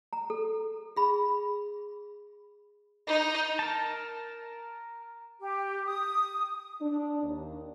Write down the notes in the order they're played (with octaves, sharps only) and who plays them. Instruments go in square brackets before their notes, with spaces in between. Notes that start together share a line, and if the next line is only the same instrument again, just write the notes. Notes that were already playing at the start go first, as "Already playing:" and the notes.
[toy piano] A#5
A4
G#4 B5
[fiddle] D#4 [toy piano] D#5
[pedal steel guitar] A#4 A5
[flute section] G4
D#6
[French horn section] D4
D#2